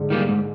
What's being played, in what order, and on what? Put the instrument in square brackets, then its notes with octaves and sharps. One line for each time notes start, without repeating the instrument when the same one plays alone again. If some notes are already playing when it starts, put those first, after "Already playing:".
Already playing: [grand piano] G#2 D3
[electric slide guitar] D#3 G3 A#3
G#2